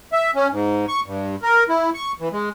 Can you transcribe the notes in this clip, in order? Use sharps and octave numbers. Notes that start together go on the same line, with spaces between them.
E5
C#4
G#2
C#6
G2
A#4
E4
C#6
E3
G#3